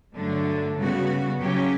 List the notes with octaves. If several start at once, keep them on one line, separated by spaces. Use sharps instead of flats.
G2 D3 F#3 A3 D4
C#3 G3 B3 F#4
C#3 F#3 C#4 G4